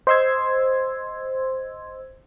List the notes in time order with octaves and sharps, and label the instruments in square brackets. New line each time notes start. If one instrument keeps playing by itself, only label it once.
[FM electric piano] C5 D#5 C6 E6 G#6